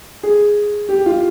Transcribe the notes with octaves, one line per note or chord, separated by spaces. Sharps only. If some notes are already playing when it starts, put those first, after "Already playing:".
G#4
G4
F4